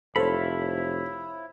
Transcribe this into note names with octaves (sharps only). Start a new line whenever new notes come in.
F1 E4 A4 C5 C#5 F5 B5